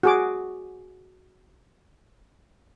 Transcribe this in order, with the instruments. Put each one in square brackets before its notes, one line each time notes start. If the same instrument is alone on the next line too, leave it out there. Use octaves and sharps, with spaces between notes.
[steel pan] F#4 G#4 D6